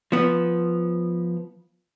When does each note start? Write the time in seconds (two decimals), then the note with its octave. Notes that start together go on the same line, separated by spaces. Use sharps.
0.12 F3 B3